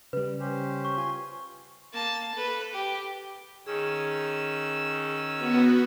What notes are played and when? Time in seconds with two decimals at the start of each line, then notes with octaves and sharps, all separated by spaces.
0.13 C#3 G3 B4
0.40 C#4 G4 C5
0.85 C#6
0.97 F4 G#5 C6
1.94 A#3 A5
2.34 A4 B4
2.73 G4
3.66 D#3 C#4 G#4 E6
5.37 B3 F#4